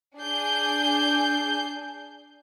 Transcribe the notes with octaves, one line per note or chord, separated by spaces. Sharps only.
D4 G#4 G6 C7